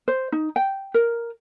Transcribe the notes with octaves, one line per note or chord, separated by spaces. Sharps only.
C5
D#4
G5
A#4